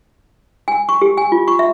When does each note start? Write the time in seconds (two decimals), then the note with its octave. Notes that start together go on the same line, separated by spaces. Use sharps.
0.68 G#5
0.89 C#6
1.02 G4
1.18 G#5
1.32 F4
1.48 C#6
1.59 E5